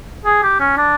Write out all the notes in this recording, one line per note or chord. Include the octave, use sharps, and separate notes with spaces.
G#4
G4
C#4
D4